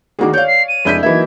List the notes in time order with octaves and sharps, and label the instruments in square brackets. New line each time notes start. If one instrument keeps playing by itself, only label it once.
[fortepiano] D2 A#3 D6 [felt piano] D#3 F#4 G#4
[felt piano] C#5 F5 [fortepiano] D5 [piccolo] G6
[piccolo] C7
D#7
[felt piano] F1 G6 B6 [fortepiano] G#3 D4 E4
[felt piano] E3 F#3 A#3 [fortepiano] D#4 E4 E5 [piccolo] G#6